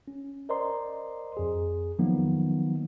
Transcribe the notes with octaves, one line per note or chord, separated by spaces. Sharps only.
C#4
A#4 C5 D5 D#5 A#5 C6
F2 G#4
D#3 F3 F#3 A#3 B3 D#4